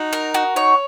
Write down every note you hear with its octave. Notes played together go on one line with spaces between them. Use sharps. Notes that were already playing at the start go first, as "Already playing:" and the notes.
Already playing: D#4 F#4
A#4
F#4
D#4 C#5